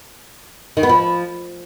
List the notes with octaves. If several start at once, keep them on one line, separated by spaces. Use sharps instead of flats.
D#3
B3
F3